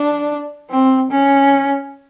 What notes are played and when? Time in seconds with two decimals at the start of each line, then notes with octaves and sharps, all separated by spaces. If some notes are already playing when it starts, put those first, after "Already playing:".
Already playing: D4
0.70 C4
1.11 C#4